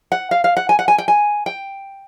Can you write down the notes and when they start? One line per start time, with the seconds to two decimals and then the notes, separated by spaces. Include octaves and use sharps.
0.12 F#5
0.31 F5
0.44 F5
0.57 F#5
0.69 G#5
0.79 F#5
0.88 G#5
0.98 G5
1.08 G#5
1.46 G5